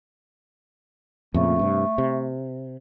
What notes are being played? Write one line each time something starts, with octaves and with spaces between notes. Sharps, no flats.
F2 A#2 C#3 A3
G2 C3
C3